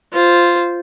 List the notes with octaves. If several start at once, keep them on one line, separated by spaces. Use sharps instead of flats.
F4 C5